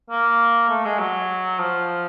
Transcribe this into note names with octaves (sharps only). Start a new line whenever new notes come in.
A#3
A3
G#3
F#3
F3